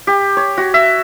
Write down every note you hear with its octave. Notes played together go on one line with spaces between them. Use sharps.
G4
C#5
F#4
E5